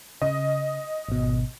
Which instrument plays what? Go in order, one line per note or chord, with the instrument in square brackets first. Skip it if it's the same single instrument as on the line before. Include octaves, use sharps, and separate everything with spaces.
[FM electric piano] C#3 [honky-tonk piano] D#5
[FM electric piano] G#1 B2